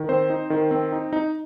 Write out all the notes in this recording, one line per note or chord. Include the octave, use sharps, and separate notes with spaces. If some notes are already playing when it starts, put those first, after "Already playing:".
Already playing: D#3
C4 C5
D#4
D#3
C4
D#4
D#4